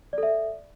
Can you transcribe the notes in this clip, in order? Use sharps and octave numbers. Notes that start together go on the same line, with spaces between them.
A4 D5 E5